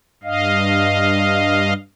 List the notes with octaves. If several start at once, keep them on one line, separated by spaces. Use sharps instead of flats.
G2 D#5 F5